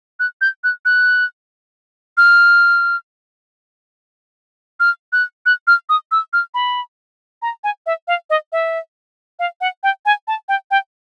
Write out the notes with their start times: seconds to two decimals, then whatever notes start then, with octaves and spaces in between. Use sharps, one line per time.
0.20 F#6
0.41 G6
0.64 F#6
0.85 F#6
2.17 F6
4.80 F6
5.13 F#6
5.46 F#6
5.67 F6
5.89 D#6
6.12 E6
6.33 F6
6.54 B5
7.42 A#5
7.64 G#5
7.86 E5
8.08 F5
8.30 D#5
8.52 E5
9.39 F5
9.61 F#5
9.83 G5
10.06 G#5
10.28 A5
10.49 G5
10.71 G5